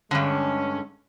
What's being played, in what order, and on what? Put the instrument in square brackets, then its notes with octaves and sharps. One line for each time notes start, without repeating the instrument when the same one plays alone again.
[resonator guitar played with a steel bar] G2 D3 [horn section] G#3 C#4